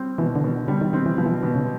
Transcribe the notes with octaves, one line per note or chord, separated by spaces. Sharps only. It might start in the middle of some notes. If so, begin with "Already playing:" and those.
Already playing: G3 C4
B2 E3
D3
B2 D#3
D3 G3
D#3
D#3 C4
E3
B2 F3
E3
F3
B2 D#3
C#3